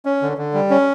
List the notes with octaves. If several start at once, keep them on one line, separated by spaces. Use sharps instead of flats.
C#4
D3
D3
G3
C#4